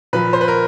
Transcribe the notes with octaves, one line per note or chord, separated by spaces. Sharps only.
A#2 F3 B4
C5
B4
A#4